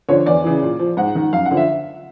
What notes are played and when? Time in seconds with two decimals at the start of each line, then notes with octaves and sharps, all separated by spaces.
0.09 D3 F3 C#5
0.26 E2 D5
0.44 C#3 E3
0.62 A#2
0.79 F3
0.97 G#2 F#5
1.15 D#3
1.33 F#2 F5
1.46 F#5
1.51 D3 F3
1.57 E5